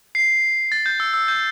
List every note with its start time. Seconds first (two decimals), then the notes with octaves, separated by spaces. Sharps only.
0.15 C7
0.72 A6
0.86 G6
1.00 E6
1.14 E6
1.28 G6